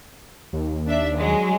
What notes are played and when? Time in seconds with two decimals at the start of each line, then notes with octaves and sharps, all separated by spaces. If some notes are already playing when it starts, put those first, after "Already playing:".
0.53 D#2
0.87 D4 E5
1.18 F#3 G#3